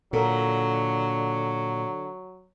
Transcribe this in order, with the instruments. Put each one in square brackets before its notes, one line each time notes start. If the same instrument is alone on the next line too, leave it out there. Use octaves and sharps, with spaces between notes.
[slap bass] A#2 [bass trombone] D3 [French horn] F#3 [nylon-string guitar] A4 A#4